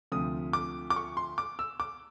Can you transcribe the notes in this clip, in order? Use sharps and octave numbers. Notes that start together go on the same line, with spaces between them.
D2 C3 F3 D#6
D6
D6
C#6
C6
D6
E6
D6